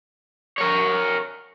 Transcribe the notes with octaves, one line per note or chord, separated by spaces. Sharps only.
A#4 C#5